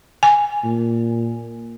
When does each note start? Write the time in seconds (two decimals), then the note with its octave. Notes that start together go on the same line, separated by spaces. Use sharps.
0.23 G#5
0.65 A#2